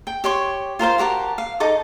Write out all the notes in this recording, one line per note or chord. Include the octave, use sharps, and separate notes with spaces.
G5
G4 C#5 C6 C#6
F4 A#4 C5 F5
F#4 G4 A#4 A5
F5
D#4 A4 D6